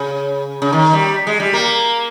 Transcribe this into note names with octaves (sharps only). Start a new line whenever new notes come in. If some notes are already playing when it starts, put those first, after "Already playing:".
Already playing: C#3
C#3
D#3
G3
G#3
G3
A#3